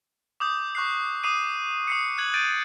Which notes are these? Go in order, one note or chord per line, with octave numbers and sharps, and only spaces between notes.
D6 D#6 G6
C#6 F#6 C7
D6 D#6 C7 D#7
D#6 C7 C#7
F#6 G#6 F#7
G6 A6 D7 D#7